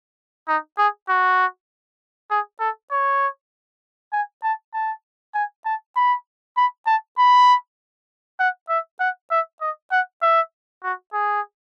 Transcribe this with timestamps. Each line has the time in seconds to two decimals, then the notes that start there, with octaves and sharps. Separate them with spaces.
0.48 D#4
0.78 G#4
1.09 F#4
2.31 G#4
2.60 A4
2.91 C#5
4.12 G#5
4.43 A5
4.74 A5
5.35 G#5
5.65 A5
5.96 B5
6.57 B5
6.87 A5
7.18 B5
8.39 F#5
8.69 E5
9.00 F#5
9.31 E5
9.61 D#5
9.92 F#5
10.22 E5
10.84 F#4
11.13 G#4